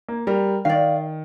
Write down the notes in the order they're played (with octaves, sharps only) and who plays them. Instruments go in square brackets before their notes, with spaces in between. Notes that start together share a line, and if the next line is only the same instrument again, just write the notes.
[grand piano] A#3
[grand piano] G3 [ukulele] A#4
[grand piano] D#3 [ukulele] D5 F5